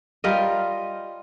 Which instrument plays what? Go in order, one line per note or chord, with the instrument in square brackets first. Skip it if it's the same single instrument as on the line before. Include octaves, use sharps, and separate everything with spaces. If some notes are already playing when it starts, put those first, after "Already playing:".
[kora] G3 F4 A#4 D#5